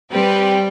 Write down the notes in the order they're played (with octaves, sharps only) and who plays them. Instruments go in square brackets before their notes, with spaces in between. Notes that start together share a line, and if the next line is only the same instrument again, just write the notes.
[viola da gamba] G3 [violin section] C4 G4 B4